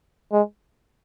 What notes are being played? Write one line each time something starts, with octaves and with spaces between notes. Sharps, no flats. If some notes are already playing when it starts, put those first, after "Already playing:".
G#3